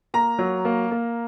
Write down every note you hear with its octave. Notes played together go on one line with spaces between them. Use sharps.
A#3 A#5
F#3
A#3
A#3